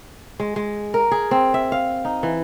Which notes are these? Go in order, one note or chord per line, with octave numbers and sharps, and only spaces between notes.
G#3
G#3
A#4
G#4
C4
E5
F5
D#4
E3